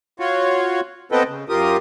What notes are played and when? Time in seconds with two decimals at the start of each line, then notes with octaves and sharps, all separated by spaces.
0.20 F4 F#4 C#5
1.12 B3 C4 A4 B4 D#5 G5
1.28 C#3
1.49 F#2 F4 G4 A#4 D#6